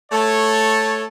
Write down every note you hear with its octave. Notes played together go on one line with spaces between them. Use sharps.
A3 A4 C#5